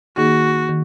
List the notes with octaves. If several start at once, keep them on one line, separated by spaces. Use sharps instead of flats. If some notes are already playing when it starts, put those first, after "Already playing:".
D#3 A#3 D#4 F#4 G#4
D#3